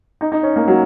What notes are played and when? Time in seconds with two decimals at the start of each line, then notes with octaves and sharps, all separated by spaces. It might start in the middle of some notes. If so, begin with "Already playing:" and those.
0.21 D#4
0.32 D#4
0.43 C#4
0.56 A#3
0.68 F#3